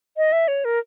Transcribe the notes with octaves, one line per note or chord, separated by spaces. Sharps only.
D#5
E5
C#5
A#4